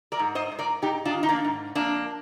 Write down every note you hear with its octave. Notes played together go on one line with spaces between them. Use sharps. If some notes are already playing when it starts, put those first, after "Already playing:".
A#4 D5
G#2
C5 D#5
G#2
A#4 D5
G#2 D#4 G4
D4 F4
D#3
D#4
A#3 D4
G#2
F2 A#3 D4